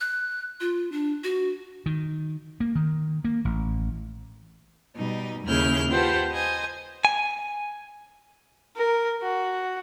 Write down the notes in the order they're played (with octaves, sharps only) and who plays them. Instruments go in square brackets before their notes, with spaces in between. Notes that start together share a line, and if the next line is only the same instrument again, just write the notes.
[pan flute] F#6
F4
D4
F#4
[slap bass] D#3
A#3
D#3
A#3
A1
[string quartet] B2 G3 D#4
D#2 C#3 E4 G#4 F6 G6
F4 G4 B4 C5 F#5 A5
C5 D#5 G#5
[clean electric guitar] G#5
[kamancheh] A#4
F#4